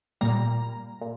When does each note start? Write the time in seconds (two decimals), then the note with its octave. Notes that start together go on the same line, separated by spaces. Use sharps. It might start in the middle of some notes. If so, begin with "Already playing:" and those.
0.21 A#2 G3 A#3 A#5
1.01 A#2